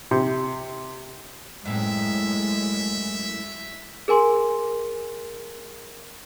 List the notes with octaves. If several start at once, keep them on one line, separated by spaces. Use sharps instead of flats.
C3
F#2 A2 G#3 C4 E5
G#4 A#4 G#5 C6